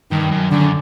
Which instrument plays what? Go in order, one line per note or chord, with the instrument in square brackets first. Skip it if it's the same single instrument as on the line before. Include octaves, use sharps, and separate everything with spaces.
[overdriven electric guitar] G2 [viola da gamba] D#3
[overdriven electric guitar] F#2
[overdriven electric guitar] F#2 [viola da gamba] D3